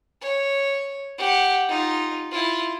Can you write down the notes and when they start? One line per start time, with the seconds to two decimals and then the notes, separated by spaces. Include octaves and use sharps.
0.21 C#5
1.18 G4 F#5
1.69 D#4 F4
2.31 E4 F4